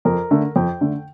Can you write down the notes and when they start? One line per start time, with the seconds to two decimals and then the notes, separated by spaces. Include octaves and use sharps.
0.05 F2 A#4
0.31 D3 A3
0.56 F2 G5
0.81 D3 A3